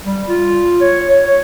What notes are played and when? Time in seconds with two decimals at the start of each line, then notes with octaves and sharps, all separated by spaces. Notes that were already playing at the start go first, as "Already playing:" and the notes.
0.05 G3
0.28 F4
0.81 C#5
1.10 C#5
1.26 C#5